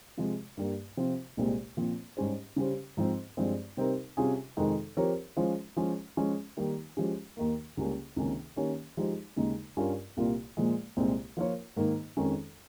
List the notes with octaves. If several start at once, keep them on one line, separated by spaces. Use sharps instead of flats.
C3 F3 G#3
G2 G3 A#3
C3 F3 C4 F4
C2 A#2 G#3 C4 G4
A#2 F3 C4
G#2 G3 C#4 G4 C5
C#3 G3 C#4 G4 C5
G#2 F3 C4
G2 F3 G#3 C4
C3 G3 C4 D#4 A#4
C3 G3 C#4 F4 G#4
F2 C3 D#3 G#3 D#4
F3 C4 G4 A#4 C#5
F3 G#3 C#4 F4 C5
F3 G#3 C#4
F3 G#3 C#4
D#3 G3 A#3 D#4
F3 G#3 C#4 G4
D#2 D#3 A#3
C#2 C#3 G3 A#3 C#4
C#2 C3 D#3 A#3 C#4
D#3 A#3 C#4 G4 C#5
F3 G#3 D#4 G4 C5
D#2 C#3 G#3 D#4
G2 G3 C#4 F4 A#4
C2 A#2 G3 A#3 F4
A#2 F3 G#3
C2 A#2 G#3 C4
F3 A#3 F4 A#4 C#5
G#2 D#3 A#3 D#4
F2 D#3 G#3 C#4